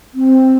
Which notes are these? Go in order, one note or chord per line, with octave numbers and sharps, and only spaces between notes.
C4